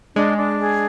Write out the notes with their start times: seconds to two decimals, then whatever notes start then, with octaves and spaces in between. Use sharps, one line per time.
0.16 G#3 D4
0.37 D4
0.58 G#4